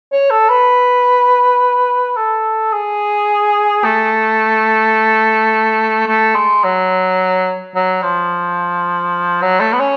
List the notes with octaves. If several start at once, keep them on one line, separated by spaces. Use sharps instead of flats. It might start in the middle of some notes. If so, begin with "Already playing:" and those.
C#5
A4
B4
A4
G#4
A3
A3
G#3
F#3
F#3
F3
F#3
A3
B3
C#4